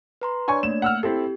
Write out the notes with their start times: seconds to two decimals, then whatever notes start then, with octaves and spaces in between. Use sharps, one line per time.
0.22 B4 A#5 C6
0.48 D4 C#5 D5 G#5 C#6 G#6
0.63 A3 A#3 E7
0.82 F#5 E6 F6
1.03 C4 E4 G4 A4